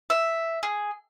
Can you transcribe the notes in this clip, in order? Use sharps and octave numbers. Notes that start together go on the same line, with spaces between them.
E5
G#4